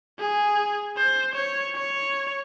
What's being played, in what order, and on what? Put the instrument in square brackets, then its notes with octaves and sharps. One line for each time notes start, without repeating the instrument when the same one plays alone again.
[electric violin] G#4
C5
C#5
C#5